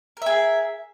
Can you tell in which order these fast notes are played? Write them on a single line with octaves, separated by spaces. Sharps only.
A#4 E5 G#4